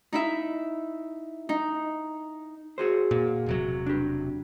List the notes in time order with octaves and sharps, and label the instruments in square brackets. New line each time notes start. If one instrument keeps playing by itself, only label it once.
[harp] D#4 E4 E5
D#4
[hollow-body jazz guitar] F#4 G#4 C5
[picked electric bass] A#2
E1 C3 F#3
[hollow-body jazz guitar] D4 G4